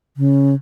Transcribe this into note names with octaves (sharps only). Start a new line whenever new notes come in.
C#3